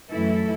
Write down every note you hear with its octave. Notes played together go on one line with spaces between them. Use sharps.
F#2 E3 A3 E4 A4